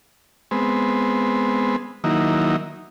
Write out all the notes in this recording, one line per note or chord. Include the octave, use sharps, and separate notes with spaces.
G#3 B3 C4
D#3 F#3 A#3 D#4 E4